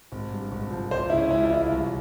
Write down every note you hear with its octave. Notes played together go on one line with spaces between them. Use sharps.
G#1
G2
G#1
F3
C#2 C5
C#3 E4
C#4
C#2 E4
F4
E3 E4
C2